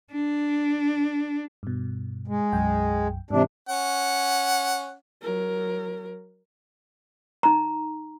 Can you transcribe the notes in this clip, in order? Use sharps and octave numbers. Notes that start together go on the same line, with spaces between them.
D4
G2 B2
G#3
B1 F#2 G5
G#2 C3 E3 D4
C#4 F#5
F#3 A#4
D#4 A#5